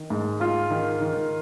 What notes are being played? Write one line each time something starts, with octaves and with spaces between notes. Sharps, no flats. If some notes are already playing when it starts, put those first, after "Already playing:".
Already playing: D#3
G#2
G#2 F4
D#3
D#3